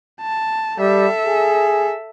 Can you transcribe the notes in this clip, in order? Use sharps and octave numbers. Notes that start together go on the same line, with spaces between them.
A5
G3 A4 E5
G#4